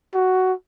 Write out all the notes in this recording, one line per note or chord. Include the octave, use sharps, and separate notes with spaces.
F#4